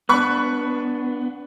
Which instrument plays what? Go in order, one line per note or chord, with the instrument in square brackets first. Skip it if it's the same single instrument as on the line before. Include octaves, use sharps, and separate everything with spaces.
[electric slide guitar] B3 D4 [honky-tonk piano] B5 C#6 F#6